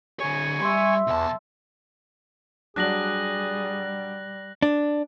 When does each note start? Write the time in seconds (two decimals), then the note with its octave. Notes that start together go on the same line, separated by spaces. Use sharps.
0.20 D3 C#5 G#5 C#6
0.61 G3 E5 C6
1.07 B1 E2 A5
2.76 F#3 G3 D4 G#4 F#6 A#6 F#7
4.62 D4